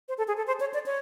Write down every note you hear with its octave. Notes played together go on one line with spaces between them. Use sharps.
C5
A4
G#4
A4
C5
C#5
D5
C#5